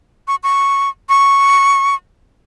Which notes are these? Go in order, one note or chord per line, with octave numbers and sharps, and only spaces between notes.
C#6
C#6
C#6